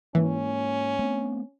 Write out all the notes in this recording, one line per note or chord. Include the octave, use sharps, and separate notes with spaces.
G#2 E3 A#3 C#4
A3 B3 C4